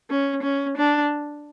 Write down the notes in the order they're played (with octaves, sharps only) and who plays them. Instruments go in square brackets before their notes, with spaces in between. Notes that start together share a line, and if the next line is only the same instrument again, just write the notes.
[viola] C#4
C#4
D4